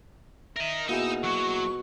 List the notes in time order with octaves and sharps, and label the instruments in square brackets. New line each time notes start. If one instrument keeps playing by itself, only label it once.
[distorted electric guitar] A#4 D#5 [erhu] E5
[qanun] B2 A#4 [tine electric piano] A#3 E4 G#4 [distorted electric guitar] D#4 [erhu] E6
[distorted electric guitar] F#3 F#4 [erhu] C#6